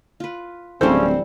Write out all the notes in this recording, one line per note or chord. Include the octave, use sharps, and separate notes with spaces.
F4 B4
D1 C#3 E3 G3 C4 C#4 A4 C5